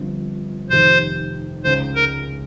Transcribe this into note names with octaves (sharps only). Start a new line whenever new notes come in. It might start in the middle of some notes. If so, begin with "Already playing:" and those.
Already playing: G1 G2 F3 C4
F1 F2 C3 D#3 C5
C#2 C#3 G#3 D#4 C5
A#4